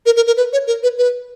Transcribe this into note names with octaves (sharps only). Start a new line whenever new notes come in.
A#4
A#4
A#4
B4
C#5
A#4
B4
B4